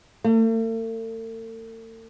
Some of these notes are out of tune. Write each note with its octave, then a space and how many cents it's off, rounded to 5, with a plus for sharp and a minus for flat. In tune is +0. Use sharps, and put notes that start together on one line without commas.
A3 +45